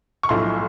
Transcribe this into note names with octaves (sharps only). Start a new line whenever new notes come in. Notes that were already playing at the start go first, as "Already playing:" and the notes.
C#6
B1 A2 F3 C6